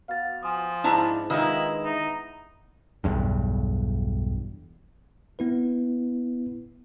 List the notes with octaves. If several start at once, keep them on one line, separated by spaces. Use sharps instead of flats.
B3 F#4 F5 F6 A6
F3 G#5 C6 D#6
G#2 D4 E4 A#5
D#3 G#3 D4 E4 F4 B4 D#6 E6
B3 D#4 E4 A#5 D#6
B1 E2 G2
B3 E4 B4